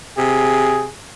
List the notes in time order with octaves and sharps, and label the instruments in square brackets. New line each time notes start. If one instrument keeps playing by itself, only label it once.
[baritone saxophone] C3 [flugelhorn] G#4